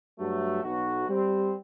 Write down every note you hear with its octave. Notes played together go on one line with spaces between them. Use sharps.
G2 F#3 A3
B1 F#4
G3 C4